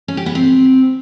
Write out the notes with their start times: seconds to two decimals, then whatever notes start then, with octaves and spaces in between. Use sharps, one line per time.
0.08 C#4
0.17 G4
0.26 B3
0.35 C4